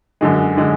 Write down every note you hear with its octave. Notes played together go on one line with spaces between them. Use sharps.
F#2 D3 G#3
D3 G#3